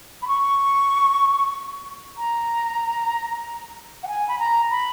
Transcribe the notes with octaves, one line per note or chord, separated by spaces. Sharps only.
B5
C#6
A#5
F#5
G#5
B5
A#5
B5